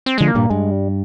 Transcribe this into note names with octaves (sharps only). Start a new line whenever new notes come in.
C4
D3 F3 G#3
A#3
G2 A#2
G2 G#3
G3